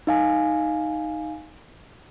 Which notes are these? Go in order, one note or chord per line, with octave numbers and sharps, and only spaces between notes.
D#4 F5 G#5